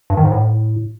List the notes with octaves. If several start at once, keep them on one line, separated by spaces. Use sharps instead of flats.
G2
D#3
G#2
A2